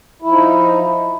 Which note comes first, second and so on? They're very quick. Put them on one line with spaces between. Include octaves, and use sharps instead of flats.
E4 F3 D#4